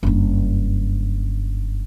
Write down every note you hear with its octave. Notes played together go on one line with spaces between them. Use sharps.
F#1 G2